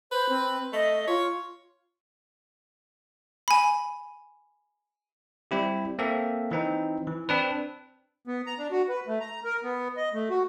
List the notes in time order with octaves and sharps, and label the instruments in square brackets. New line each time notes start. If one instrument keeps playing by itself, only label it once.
[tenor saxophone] B4 [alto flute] C5
[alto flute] C4
[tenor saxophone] A3 [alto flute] D#5
[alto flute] F4 [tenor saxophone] C#5
[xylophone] G#5 B5
[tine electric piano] G3 C4 E4 G4
A#3 C4 A4 E5
E3 C4 D#4
E3
C4 D4 B4
[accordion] B3
A#5
D4
F#4
B4
A3
A#5
A#4
B3
D#5
A3
F#4